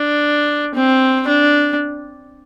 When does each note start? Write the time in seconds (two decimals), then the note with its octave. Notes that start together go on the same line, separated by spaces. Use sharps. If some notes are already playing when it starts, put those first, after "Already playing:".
Already playing: D4
0.75 C4
1.28 D4